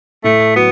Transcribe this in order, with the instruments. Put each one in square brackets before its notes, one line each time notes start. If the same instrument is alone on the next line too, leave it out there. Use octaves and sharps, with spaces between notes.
[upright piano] A2 [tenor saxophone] A3
[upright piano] F#3 [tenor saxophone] B3